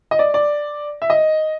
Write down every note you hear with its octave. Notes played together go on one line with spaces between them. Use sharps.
D#5
D5
D5
E5
D#5